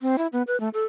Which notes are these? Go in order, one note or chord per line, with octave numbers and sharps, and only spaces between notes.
C4
E4
B3
B4
A3
A4